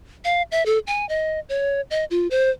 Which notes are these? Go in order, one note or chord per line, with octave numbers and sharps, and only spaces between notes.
F5
E5
A4
G#5
D#5
C#5
D#5
F4
C5